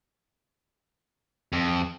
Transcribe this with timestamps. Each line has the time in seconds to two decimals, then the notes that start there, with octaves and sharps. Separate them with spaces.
1.52 F2